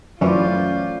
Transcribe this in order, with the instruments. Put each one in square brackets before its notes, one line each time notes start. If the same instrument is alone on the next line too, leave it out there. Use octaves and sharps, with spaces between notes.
[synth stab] F#2 E3 [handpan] A3 C5 D5 [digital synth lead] C#4 [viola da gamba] F4